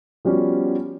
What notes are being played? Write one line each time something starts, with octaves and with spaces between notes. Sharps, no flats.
F3 G3 B3 C#4 F#4